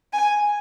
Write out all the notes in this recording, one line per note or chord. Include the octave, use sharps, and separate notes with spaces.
G#5